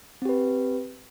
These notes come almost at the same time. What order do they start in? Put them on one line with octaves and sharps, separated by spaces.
C4 G4 B4